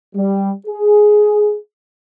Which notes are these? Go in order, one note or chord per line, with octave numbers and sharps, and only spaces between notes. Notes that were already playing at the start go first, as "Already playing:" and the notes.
G3
G#4